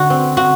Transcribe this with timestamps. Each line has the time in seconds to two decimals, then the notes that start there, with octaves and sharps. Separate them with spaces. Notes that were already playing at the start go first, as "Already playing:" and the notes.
Already playing: D3 A3 F#4
0.10 C4
0.37 F#4